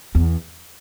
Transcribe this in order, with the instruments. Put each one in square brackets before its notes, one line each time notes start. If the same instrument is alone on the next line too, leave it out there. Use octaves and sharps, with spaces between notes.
[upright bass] E2